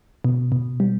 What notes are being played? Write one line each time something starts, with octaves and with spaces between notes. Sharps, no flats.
B2
B2
G3